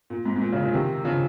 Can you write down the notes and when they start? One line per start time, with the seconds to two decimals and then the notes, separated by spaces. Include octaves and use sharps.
0.10 A#2
0.25 G#2
0.36 G#2
0.41 A#2
0.53 A#2 C#3
0.63 A#2 C#3
0.73 C3 D#3
1.04 C#3 F3